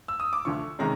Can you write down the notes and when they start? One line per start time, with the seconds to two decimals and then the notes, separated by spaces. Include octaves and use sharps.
0.08 E6
0.20 D#6
0.33 D6
0.45 D2 D3 F3 C#6
0.79 C3 D#3 G#3 C#4 A#5